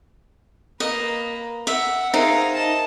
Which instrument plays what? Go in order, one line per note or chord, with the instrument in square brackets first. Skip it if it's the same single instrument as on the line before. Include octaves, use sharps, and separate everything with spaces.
[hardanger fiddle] A#3 B4 [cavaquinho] D#5
[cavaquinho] E5 [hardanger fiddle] F#5
[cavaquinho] D#4 [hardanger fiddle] G#4 F5 [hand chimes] A#4 C5 E5
[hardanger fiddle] D#5 A5